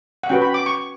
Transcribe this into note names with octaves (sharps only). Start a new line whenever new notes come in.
F#5
C#4 F#4 B4 G5
B5
D6
C#6